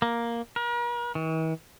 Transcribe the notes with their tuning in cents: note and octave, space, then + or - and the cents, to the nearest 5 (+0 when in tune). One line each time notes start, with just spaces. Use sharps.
A#3 +5
A#4 +45
E3 -45